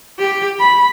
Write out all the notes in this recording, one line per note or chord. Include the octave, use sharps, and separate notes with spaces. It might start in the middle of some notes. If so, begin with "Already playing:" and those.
G4
B5